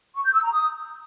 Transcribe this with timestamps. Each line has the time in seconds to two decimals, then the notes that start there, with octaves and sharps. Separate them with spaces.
0.15 C#6
0.24 G6
0.33 E6
0.42 A#5
0.51 D#6